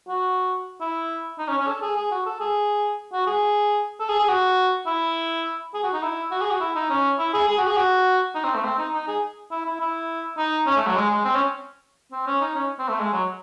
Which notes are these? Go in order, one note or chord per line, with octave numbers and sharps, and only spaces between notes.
F#4
E4
D#4
C#4
C#4
A4
G#4
G#4
F#4
A4
G#4
F#4
G#4
A4
G#4
G#4
F#4
E4
G#4
F#4
D#4
E4
F#4
G#4
F#4
E4
D#4
C#4
E4
G#4
G#4
F#4
G#4
F#4
D#4
C4
A3
C4
D#4
D#4
G#4
E4
E4
E4
D#4
C#4
A3
F#3
G#3
G#3
C4
C#4
C4
C#4
D#4
C#4
C4
A3
G#3
F#3